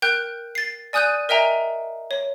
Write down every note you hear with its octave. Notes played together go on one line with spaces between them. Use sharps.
A#4 G5 F#6 G6
A6 C7
D5 G#5 D#6 F#6 G6 D#7
A#4 D#5 E5 G5 G#5 A#5
C#5